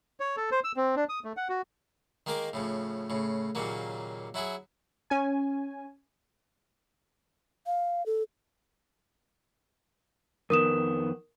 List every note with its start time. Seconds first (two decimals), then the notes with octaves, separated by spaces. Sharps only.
0.20 C#5
0.37 A4
0.52 C5
0.64 E6
0.76 C4
0.96 D4
1.09 D#6
1.24 A3
1.37 F#5
1.49 F#4
2.26 D#3 G#3 A#3 A#4 D6
2.53 A2 C#3 F3
3.10 A2 C#3
3.55 D#2 A#2 C#3 F#3 A#3
4.34 F#3 E4 F#4 G#4
5.10 C#4 G#5
7.66 F5
8.06 A4
10.50 F2 D#3 B3 A#4 D#6 E7